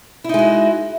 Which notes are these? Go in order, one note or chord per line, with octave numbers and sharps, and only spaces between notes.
G#3 D#4 E4 F#4